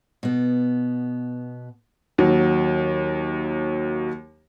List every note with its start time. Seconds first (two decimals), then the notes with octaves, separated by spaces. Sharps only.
0.23 B2 B3
2.18 D#2 F#3